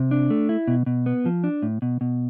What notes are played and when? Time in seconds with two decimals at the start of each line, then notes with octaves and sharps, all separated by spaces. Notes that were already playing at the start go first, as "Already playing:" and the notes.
Already playing: C3
0.11 D4
0.30 A3
0.49 E4
0.68 B2
0.86 B2
1.06 B3
1.26 F3
1.44 D4
1.63 A2
1.82 B2
2.01 B2